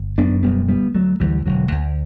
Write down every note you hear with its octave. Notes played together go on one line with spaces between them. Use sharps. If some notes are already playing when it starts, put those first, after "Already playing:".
Already playing: G1
F#2 B3 D4
E1 G3 B3
D2 G3 B3
D2 F#3 A3
D2 E3 G3
E1 D3 F#3
D2